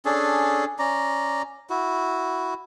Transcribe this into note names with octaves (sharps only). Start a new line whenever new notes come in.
C#4 D4 G#4 A4
C#4 D5 A#5
E4 F#4